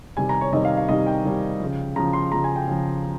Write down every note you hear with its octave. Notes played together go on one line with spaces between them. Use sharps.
C3 D#3 G3 G#5
A#5
C#5
C3 D#3 G3 D#5
F5
F5
C3 D#3 G3 D#5
G5
C3 D#3 G3
C#3 F3
C#3 F3 A#5
C6
C#3 F3 A#5
G#5
G5
C#3 F3